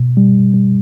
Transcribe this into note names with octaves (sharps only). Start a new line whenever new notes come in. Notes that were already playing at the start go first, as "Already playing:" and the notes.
Already playing: B2
G3
G3